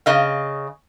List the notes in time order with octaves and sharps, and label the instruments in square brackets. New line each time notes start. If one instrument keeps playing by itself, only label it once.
[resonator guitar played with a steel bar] C#3 D#5 F5